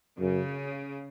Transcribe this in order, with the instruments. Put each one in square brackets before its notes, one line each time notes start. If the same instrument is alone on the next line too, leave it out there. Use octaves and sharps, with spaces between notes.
[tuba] F#2 [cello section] C#3